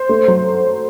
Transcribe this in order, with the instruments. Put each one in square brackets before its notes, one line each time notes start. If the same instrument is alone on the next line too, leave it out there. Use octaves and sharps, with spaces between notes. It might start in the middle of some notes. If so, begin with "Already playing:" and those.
Already playing: [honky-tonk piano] C5
A3
F#3